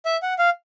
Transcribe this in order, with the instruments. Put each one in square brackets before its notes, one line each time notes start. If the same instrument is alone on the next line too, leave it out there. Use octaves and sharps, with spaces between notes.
[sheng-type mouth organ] E5
F#5
F5